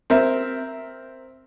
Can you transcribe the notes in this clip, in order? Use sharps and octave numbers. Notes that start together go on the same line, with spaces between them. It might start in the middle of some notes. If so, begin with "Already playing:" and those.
C4 A#4 E5